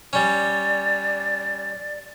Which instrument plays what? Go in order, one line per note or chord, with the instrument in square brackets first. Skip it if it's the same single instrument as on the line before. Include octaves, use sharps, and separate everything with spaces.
[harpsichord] G3 C#4 [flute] D5